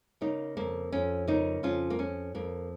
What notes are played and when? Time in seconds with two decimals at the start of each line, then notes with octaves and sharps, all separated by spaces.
0.21 C#3 A#3 D#4
0.57 F2 A#3
0.92 F2 C#4
1.27 C#3 A#3 D#4
1.63 F2 C#4 F4
1.90 A#3
1.99 F2 C#4
2.35 F2 A#3